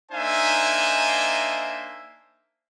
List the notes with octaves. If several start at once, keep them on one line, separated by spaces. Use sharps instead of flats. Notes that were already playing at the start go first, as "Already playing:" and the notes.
A#3 D4 D#4 C5 E5 G#5